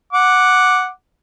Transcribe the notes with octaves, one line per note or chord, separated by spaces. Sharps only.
F#5 D6